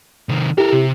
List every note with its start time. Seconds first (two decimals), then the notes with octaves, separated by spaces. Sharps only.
0.29 C3 D#3
0.58 E4 G4 A4 A#4
0.72 C3